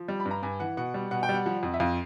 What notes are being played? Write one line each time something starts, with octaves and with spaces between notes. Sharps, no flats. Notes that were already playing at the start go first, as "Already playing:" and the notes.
Already playing: F3
G3
B5
G2
A#5
G2 G#5
E3 F#5
B2 F#5
G3
B2 F#5
G5
G3
F#5
F3 F#5
F2
E5
F2 F5